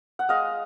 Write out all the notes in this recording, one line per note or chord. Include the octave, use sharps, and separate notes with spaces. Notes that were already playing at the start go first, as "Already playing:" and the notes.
F#5
G#3 D#5 F5